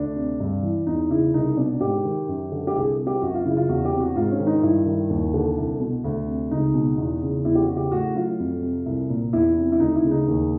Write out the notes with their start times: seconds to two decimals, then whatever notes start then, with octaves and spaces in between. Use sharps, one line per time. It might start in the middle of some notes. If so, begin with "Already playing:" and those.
Already playing: D2 D4
0.16 C3
0.40 G2
0.63 E3
0.86 E2 D#4
1.10 C#3 E4
1.34 C2 D#4
1.57 B2 D4
1.81 G#2 G4
2.05 D#3
2.28 F#2
2.51 D3
2.67 G4
2.75 C2 G#4
2.98 C3
3.07 G4
3.22 F#2 F#4
3.34 F4
3.45 C#3 E4
3.57 F4
3.69 E2 F#4
3.85 G4
3.93 C3
4.00 F#4
4.16 G#2 F4
4.31 C#4
4.40 D#3
4.47 D#4
4.63 G2 E4
4.86 D#3
5.10 D#2
5.34 D3
5.58 C2
5.80 B2
6.04 D2
6.27 C3
6.51 C#2 D#4
6.74 B2
6.97 E2
7.22 C#3
7.45 E2 E4
7.55 G4
7.61 F#4
7.68 C#3
7.77 G4
7.91 A2 F#4
8.15 F#3 F4
8.39 F2
8.62 C3
8.86 C2
9.10 A#2
9.33 E2 E4
9.57 C3
9.72 E4
9.80 D2 D#4
9.96 E4
10.04 C#3
10.11 D#4
10.28 D#2